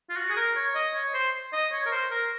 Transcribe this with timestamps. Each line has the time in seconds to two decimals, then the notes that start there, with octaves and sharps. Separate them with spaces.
0.10 F4
0.17 F#4
0.30 G#4
0.37 A#4
0.56 C#5
0.75 D#5
0.94 C#5
1.14 C5
1.53 D#5
1.72 C#5
1.86 A#4
1.92 C5
2.11 A#4